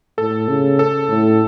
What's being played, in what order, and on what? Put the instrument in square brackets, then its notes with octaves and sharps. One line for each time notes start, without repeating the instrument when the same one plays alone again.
[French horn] A2 [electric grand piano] A4
[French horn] C#3
[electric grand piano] A4
[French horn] A2